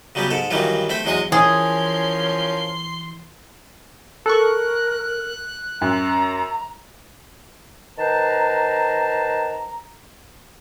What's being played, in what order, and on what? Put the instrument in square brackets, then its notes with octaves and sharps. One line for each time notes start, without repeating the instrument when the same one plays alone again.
[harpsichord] C#3 F#3 G3 B3 G4
G#2 A4
G2 D#3 E3 F#3 G3 F4
A3 C4 C5 B5
E2 F#3 G#3 C6 C#6 D#6
[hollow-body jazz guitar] E3 [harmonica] F3 C#4 A#4 [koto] G#4 [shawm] C6
[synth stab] A4 C#6 [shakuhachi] A#4 [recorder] F#6
[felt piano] F#2 [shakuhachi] A#5
[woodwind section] D#3 B4 C5 A5 A#5